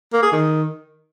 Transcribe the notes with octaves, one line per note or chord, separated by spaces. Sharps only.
A#3
G#4
D#3